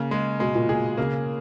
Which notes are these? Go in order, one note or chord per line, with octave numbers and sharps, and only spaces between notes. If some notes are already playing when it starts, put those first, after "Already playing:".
Already playing: C#3 A#3
G#3
B2 G#3
A#2
A#2 G#4
C#3 A#3